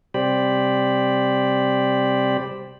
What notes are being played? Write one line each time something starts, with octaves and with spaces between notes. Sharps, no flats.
C3 G3 G4 C5 D5 B5